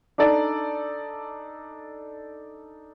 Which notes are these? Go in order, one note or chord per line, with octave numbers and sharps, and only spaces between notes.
D4 D#4 A4 D5